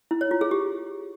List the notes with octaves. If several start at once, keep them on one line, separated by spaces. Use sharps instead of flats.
E4
C#5
F4
G#4
G4